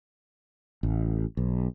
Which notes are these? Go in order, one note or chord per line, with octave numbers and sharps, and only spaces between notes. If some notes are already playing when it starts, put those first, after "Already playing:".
A1
B1